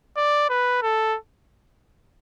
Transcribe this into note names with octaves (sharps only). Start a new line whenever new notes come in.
D5
B4
A4